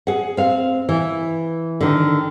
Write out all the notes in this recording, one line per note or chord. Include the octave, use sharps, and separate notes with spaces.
G#4 F#5
C4 F5
E3
D3 D#3